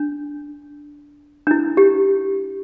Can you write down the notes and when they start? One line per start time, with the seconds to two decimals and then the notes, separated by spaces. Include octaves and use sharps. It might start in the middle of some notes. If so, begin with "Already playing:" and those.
Already playing: D4
1.47 D4
1.51 E4
1.77 G4